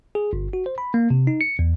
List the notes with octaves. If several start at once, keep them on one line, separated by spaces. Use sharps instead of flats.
G#4
G1
F#4
C5
B5
A#3
C3
D#4
C#7
E2